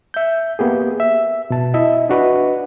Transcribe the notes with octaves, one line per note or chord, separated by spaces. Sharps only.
E5 G6
A#3 B3 G4 G#4
E5
B2 A5
E4 D#5 E5
D4 F#4 B4 D#5